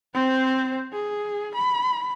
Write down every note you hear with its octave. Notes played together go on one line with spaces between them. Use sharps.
C4 C5
G#4
B5